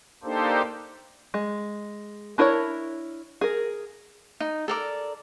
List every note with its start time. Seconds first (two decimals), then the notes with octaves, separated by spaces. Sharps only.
0.24 A#3 D4 D#4 G4 A4 C5
1.34 G#3
2.38 D4 E4 A#4 B4 C#5
3.41 G#4 A#4
4.40 D#4
4.68 A4 A#4 D5